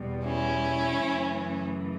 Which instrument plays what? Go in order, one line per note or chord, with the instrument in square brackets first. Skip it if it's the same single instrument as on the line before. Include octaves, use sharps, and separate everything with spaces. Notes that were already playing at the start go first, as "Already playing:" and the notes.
Already playing: [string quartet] E2 B2 G3
C#4 E4
F#2 C#3 E3 A3